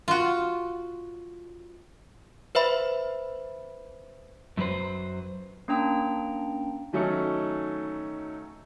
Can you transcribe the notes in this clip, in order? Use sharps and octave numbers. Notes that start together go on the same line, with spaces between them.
F4 F#4
B4 C5 E5 B5
F#2 F#3 A#3 B4 C5
A#3 C#4 D4 G5 A#5
D#3 F#3 A3 C#4 D#4